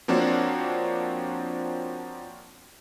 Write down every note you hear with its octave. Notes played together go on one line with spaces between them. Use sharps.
F3 A#3 C4 D4 F#4 C#5